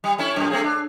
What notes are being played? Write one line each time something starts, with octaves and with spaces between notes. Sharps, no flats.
G3
A3 C#4 E4
F#2 A#2
A3 C4 G#4
D4